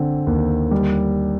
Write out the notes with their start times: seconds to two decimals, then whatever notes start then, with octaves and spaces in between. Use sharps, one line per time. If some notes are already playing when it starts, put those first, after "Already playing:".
Already playing: D3 C4
0.27 D#2
0.71 G3